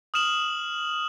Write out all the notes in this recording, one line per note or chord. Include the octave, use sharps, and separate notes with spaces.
D#6 F6 E7 F#7